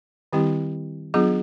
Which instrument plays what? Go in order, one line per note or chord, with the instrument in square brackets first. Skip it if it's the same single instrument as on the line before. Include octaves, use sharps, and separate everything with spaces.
[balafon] D#3 G3 C4 E4 G4
F#3 B3 D4 F4 G#4